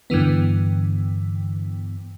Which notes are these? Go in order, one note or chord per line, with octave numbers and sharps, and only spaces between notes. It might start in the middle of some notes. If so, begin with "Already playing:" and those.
G2 D3 E3 B3